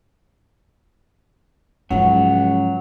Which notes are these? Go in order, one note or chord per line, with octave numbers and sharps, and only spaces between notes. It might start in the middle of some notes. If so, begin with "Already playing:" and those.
C#2 G#2 F3 F#3 F#5